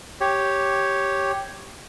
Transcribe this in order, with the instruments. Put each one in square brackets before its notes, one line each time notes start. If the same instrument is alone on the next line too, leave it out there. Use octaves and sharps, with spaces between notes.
[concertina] G4 C#5